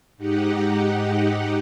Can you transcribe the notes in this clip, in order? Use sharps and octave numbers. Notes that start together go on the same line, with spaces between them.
G#2 D#4 G4 F#5